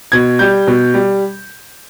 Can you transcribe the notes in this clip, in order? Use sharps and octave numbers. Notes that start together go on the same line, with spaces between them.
B2 G#6
G3 G6
B2
G3